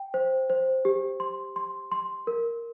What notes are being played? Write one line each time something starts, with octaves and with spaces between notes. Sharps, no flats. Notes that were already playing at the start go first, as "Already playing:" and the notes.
Already playing: G5
C5
C5
G4
C6
C6
C6
A#4